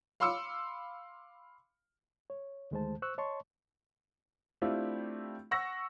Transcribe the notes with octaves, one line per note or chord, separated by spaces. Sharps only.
F5 B5 C6 D6 E6 C#7
C#5
D2 D#3 G#3 A3 C5 A5
C5 C#6 E6 F#6
C#5 D#5 A5 C6 C#6
A3 C4 D4 E4 F4 G4
F#5 C#6 E6 A#6